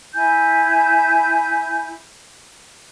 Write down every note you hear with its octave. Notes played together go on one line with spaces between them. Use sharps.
E4 G#5 G6